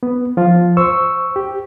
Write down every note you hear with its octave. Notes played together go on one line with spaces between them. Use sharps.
B3
F3 F4
C5 C#6 E6
G4